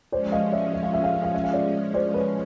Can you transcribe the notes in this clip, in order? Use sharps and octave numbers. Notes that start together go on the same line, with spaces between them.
F3 G#3 C#4 C5 D5
D#5 F5
D5 E5
E5
F5
E5
F5
E5
F5
E5
F5
D5 E5
C5 D5
B4 C#5